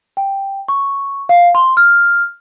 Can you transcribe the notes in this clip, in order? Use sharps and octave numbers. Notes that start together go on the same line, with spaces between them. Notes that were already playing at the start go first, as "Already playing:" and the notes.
G5
C#6
F5
C6
F6